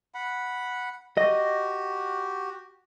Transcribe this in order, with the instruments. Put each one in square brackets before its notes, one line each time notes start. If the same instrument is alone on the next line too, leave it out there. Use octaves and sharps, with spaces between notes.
[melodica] F#5 B5
[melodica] F#4 G4 [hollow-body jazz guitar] D#5